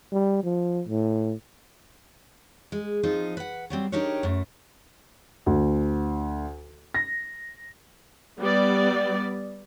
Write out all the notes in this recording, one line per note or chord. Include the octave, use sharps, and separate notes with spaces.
G3
F3
A2
G#3
F3 C4 D#4 F4
B4 F#5
F#3 G3 C4
D4 D#4 G4 A#4 C#5
F#2 A3
D2
A#6
G3 B3 D5